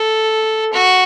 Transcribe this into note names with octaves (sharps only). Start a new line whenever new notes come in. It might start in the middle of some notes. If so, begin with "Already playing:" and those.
Already playing: A4
F#4